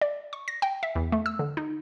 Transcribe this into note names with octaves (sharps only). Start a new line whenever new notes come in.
D5
C#6
A#6
G5
E5
E2
A3
E6
D3
D#4